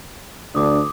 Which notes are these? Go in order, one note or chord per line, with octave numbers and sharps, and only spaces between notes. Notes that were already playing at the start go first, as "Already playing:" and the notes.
D2 D4 D6 D#6